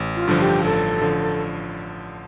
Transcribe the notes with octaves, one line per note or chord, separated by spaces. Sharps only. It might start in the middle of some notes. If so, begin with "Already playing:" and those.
Already playing: A1
F4
G2 D3 F3
G4
A1 A4
D3 F3